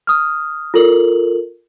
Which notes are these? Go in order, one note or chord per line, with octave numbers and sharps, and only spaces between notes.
D#6 F6
F4 A4 A#4 F#7